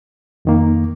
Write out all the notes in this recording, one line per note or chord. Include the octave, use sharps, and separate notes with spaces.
F2 D#3 A#3